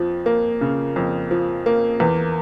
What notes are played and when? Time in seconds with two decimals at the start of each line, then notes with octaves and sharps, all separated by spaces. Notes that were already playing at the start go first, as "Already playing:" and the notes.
Already playing: F2 F3
0.26 A#3
0.61 C#3
0.96 F2
1.31 F3
1.66 A#3
2.00 E2